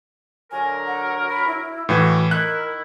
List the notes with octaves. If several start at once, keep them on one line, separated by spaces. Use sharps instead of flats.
D3 F#3 A#4 G#5
F#5
B5
E4
A2 E3 F#4
D#3 E4 A#4 F#6